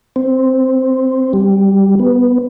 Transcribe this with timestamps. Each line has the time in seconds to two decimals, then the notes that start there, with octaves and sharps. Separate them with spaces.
0.16 C4
1.33 G3
1.99 B3